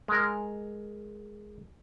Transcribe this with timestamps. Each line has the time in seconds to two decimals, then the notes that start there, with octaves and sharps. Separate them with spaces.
0.08 G#3 A#4